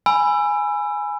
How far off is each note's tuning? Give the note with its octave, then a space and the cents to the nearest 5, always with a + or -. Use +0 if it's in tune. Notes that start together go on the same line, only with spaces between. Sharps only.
G#5 +0 B5 +0 E6 +25